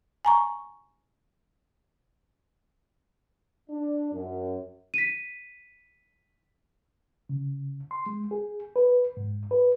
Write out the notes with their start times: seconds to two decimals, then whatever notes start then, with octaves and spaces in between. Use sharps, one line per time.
0.25 G#5 A#5 C#6
3.70 D4
4.12 F#2
4.94 B6 D#7
7.29 C#3
7.91 C6
8.06 G#3
8.31 G#4
8.76 B4
9.17 G#2
9.51 B4